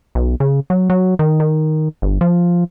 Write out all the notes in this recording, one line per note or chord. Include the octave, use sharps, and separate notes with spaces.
B1
C#3
F#3
F#3
D#3
D#3
G1
F3